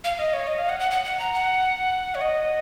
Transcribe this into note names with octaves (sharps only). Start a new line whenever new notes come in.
F5
D#5
C#5
D#5
F5
F#5
F#5
F#5
F#5
A#5
F#5
C#5
D#5